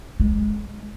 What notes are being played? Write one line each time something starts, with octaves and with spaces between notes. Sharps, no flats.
G#3